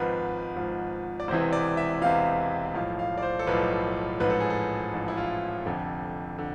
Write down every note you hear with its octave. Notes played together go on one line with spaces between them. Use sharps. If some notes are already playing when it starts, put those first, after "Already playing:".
Already playing: G#1 G#2 F3 B4
G#1 G#2 F3
D5
E1 E2 C3 E3 C5
D5
E5
E1 E2 C3 E3 F5
B1 A2 F3 F5
F5
D5
C5
A4
B1 A2 F3 B4
A1 G#2 F3 B4
A4
G#4
A4
A1 G#2 F3
E4
F4
F1 F2 D3
D3